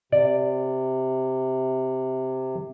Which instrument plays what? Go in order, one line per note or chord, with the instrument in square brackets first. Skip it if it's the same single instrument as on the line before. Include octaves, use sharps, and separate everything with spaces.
[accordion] C3 [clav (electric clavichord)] D5